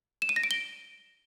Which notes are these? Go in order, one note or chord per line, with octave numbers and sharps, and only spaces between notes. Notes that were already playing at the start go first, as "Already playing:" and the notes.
E7
D#7
A#6
D7
G7